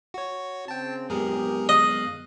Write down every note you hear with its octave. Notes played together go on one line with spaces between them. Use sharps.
F#4 C#5
C#3 C4 G5 A5
F#2 G#3 B3 G4 G#4 A#4
D#5 F5 F#6